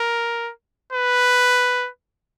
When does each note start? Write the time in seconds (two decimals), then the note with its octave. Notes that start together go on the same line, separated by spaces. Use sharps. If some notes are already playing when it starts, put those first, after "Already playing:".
Already playing: A#4
0.92 B4